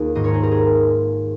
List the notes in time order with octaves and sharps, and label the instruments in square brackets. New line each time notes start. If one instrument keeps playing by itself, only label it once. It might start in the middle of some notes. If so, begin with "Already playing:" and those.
Already playing: [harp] D#2 F4 G#4
G#1 G#2 D#3 C5 D#5
A#4 C#5
G#4 C5
G4 A#4
G#4 C5